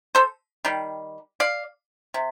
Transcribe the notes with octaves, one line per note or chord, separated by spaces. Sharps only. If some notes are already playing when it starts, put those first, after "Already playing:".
A4 C5
D#3 G3
D5 F5
C3